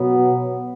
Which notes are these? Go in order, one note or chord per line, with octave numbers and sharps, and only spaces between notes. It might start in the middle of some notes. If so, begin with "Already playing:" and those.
Already playing: B2 F#3 B3